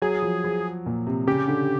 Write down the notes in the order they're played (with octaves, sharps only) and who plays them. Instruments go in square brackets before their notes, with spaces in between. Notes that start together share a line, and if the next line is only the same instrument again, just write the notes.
[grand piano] F#3 [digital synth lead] G#4
[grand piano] F3
F3
A#2
C3
[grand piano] C#3 [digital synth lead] G4
[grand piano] D3